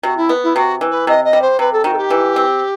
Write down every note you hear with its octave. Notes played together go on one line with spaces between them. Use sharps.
C3 F#4
E4
B3
E4
C3 F#4
E3
B4
C3 D#5
D#5
G3
C5
C3 B4
A4
D#3 F#4
A4
G4
E3
C4